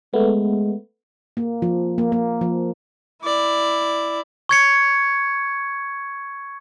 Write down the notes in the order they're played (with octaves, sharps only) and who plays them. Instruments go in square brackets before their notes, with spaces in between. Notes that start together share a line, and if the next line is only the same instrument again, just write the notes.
[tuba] G#3 [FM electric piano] A3 B3
[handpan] A#3
F3
A#3
A#3
F3
[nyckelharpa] E4 D5
[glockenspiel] C#6 G#6 C#7